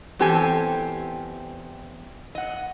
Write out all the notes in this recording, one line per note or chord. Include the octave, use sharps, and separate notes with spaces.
E2 C4 G4 A4 G#5
D#5 F#5